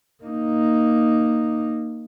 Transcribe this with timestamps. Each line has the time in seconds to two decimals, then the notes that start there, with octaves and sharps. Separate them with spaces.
0.23 A#3 D#4